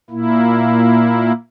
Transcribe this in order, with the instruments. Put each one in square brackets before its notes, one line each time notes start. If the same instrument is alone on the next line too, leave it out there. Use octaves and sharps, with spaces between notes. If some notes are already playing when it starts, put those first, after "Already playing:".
[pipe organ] A#2 A#3 E4